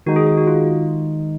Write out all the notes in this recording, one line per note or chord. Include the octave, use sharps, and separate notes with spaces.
D#3 G#3 D#4 F#4
G#4
G#4
F#4
F4